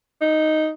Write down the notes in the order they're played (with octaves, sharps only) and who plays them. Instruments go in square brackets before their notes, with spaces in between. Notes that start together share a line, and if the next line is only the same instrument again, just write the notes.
[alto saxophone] D#4